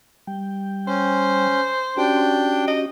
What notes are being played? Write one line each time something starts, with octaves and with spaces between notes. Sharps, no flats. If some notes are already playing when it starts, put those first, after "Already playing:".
G3 G5
C#4 C5
C#4 D4 F#4 G4 G5
D#5